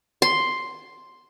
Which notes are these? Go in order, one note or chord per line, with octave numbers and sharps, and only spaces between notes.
C6